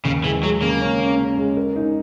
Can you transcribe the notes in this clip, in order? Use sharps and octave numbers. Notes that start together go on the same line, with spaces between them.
D#2 C#3
E3 G#3
F#3 G#3
C#3 A#3
C#4
C#4
C#4
G#3
A#4
D#4